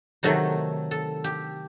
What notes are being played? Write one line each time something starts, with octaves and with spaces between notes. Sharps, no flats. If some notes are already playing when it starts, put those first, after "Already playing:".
C3 D#3 F#3 A3 A4
A4
G4